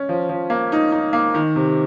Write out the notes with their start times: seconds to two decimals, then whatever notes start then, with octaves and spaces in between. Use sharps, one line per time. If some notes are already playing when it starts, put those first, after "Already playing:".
Already playing: C#4
0.09 F3
0.29 F3
0.50 A#3
0.72 D#4
0.92 D#4
1.13 A#3
1.34 D#3
1.56 C3